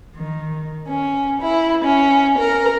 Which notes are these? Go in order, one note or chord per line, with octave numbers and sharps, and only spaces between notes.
D#3
C#4
E4
C#4
A#4